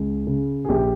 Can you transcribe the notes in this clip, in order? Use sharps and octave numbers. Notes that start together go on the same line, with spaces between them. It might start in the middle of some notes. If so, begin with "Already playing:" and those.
Already playing: C#2
C#3
G#4
A#1 G4